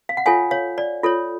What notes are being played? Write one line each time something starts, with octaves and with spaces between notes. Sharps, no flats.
F5
F#5
F4 A4 C#5 F5 G#5
C#5 F5
D5
F4 A4 C#5